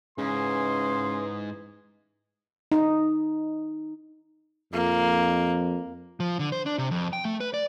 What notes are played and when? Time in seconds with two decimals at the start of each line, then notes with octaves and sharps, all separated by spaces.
0.18 G#2 C#3 E3 G#4 C6
2.72 D#4
4.73 F2 A#3
6.20 F3
6.39 D3
6.52 C5
6.66 D4
6.78 C3
6.91 F2
7.13 G5
7.25 A3
7.40 B4
7.54 D5